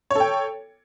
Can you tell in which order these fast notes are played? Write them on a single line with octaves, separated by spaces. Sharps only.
C#5 A4 G5